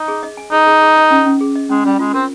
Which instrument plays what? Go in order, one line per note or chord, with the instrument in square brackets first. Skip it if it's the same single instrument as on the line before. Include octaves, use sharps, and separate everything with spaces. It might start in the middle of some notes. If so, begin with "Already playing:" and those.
Already playing: [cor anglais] D#4
[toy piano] G#4
D#5
G#5
[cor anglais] D#4 [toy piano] G#4
[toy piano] G#4
G#4
D#5
C#4
C#4
G#4
D#5
[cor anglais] G#3 [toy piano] C#4
[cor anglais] G3 [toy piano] C#4
[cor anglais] G#3 [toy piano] F4
[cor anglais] C4 [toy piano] A#4